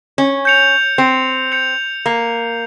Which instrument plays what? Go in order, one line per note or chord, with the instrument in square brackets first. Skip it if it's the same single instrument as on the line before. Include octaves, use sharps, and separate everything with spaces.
[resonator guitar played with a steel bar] C#4
[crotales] G6 C#7 F7
[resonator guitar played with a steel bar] C4
[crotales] G6 C#7 F7
[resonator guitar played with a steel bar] A#3